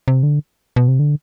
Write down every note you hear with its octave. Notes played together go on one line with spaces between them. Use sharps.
C3
D3
B2
C3
D3